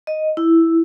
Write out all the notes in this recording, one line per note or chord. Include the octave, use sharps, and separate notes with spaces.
D#5
E4